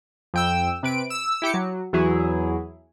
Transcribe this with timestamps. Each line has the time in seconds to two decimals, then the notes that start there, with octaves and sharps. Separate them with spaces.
0.34 F2 G5 E6
0.83 C3 B4 D7
1.10 E6
1.42 E4 G4 D6 C#7
1.54 F#3
1.93 E2 F#3 E4 G#4